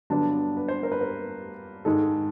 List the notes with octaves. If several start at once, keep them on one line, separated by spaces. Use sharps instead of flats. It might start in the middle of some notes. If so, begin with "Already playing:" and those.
G2 D3 F#3 B3 D4 A5
B4
C5
A#4
B4
A#4
G#2 D#3 G#3 A4